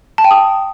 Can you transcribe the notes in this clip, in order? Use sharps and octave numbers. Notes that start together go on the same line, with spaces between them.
A5
G5
D#6